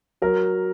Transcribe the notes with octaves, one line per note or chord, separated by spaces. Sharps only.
F#3 A#4